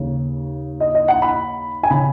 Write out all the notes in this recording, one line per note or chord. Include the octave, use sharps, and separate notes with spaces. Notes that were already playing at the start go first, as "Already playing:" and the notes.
Already playing: D#2 C#3
D#5
D#5
F#5
B5
G#5
C#3 B5